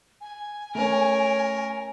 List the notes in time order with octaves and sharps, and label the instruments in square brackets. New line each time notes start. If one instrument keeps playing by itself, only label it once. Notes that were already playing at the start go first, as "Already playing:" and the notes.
[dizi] G#5
[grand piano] A3 C#4 [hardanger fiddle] A#4 C#5